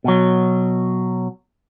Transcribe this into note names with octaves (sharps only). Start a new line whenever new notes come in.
B2 F#3